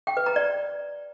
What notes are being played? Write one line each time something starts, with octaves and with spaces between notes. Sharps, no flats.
G5
B4
A#5
D5